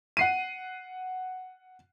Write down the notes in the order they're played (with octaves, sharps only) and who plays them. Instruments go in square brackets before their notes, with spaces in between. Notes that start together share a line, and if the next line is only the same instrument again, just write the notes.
[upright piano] F#5 C7 D#7